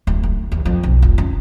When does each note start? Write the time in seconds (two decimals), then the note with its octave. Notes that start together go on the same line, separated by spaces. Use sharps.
0.07 D1
0.23 D2
0.52 D#2
0.66 F2
0.83 B1
1.02 F1
1.18 C#4